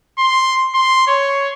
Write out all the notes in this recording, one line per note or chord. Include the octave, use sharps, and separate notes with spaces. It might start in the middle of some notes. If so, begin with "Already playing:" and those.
C6
C6
C#5